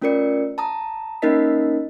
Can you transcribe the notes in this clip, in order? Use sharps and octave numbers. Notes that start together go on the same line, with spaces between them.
A3 C#4 F4 A#4 D5 C#7
A5 A#5 D#6
A#3 C#4 D#4 A#4 D#5 B6